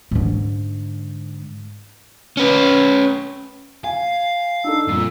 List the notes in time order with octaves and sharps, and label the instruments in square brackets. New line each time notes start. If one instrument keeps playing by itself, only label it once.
[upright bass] G#2 D3
[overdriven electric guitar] C#4 B4
[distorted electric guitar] F5 [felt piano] G#5
[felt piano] D4 D#4 A4 [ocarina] E6
[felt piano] G1 F2 [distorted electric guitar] A#2